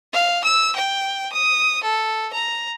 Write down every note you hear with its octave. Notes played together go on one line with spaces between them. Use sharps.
F5
E6
G5
D#6
A4
A#5